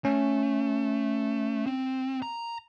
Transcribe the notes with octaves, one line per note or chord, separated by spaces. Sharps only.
A3 C#4
C4
A#5